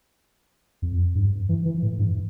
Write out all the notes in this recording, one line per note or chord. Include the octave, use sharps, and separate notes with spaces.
F2
G2
E3
E3
A2
G2